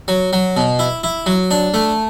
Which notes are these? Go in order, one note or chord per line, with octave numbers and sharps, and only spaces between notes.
F#3
F#3
B2
E4
E4
F#3
D4
A3